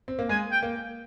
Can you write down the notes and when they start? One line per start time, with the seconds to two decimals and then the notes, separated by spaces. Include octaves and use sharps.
0.08 C4
0.19 A#3
0.29 G#3 G#5
0.52 G5
0.63 A#3